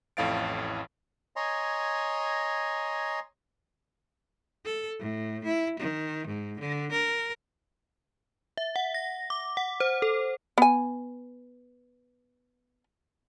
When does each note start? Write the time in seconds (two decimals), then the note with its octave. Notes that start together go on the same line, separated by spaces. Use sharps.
0.17 A1 F2 A2 F5 A6 D7
1.36 C#5 D#5 G#5 A#5 C6
4.65 A4
4.99 A2
5.44 E4
5.79 D#3
6.27 G#2
6.59 D3
6.91 A#4
8.57 E5
8.76 F#5
8.94 A#6
9.30 D6
9.57 F#5
9.80 C5
10.02 A4
10.58 B3 G#5